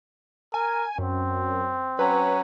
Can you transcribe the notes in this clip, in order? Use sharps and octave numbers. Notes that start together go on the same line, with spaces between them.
A#4 G#5
F#2 C4
F#3 C#4 B4